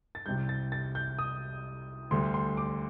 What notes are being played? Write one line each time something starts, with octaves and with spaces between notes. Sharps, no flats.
A6
C2 C3 G3 G6
A6
A6
G6
D#6
D2 D3 G3 C6
C6
D6